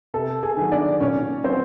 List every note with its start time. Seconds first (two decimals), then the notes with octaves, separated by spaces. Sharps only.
0.14 C3 A4 A5
0.43 G#4 G#5
0.57 D#3 F#3
0.72 D4 D5
1.00 A#2 C#4 C#5
1.44 F#3 C4 C5